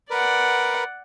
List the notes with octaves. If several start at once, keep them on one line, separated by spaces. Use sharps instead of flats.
A#4 B4 D5 F#5